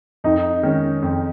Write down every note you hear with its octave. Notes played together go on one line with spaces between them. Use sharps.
F2 D#4
D#3 G#3 C#4
F2